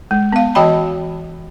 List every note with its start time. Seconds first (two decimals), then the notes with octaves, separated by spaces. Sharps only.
0.11 G#3
0.32 B3 F5
0.55 E3 F#4 D#5 G5 A5 B5